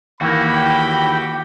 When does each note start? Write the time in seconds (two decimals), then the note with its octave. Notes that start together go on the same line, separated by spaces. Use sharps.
0.21 D#2 E3 A#3 F#4 G4 C#5 B5
0.56 G5